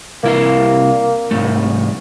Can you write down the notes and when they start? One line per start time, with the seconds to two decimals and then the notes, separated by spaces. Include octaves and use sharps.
0.23 C2 A#3 E4 F5
1.31 C2 G#2 A3